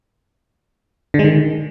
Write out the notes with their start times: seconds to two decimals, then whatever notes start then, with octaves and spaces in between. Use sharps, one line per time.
1.14 D3
1.19 G#3
1.24 D#3